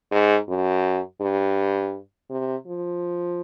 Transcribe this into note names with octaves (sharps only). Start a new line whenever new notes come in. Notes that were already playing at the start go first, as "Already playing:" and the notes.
G#2
F#2
G2
C3
F3